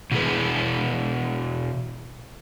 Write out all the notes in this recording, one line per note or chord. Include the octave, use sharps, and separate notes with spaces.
B2 E3 G#4 B4